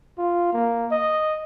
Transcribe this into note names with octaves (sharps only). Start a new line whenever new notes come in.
F4
A#3
D#5